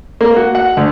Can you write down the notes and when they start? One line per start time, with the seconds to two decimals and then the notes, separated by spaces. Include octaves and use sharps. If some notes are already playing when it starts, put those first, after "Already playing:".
0.21 A#3
0.36 F#4
0.55 F#5
0.77 D2